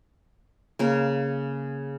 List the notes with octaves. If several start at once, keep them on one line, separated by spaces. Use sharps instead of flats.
C#3 A#3